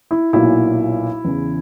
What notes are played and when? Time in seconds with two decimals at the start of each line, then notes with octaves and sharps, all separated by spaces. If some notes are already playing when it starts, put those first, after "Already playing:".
0.11 E4
0.33 B1 A#2 F#3 E4
1.25 E2 C#3 E3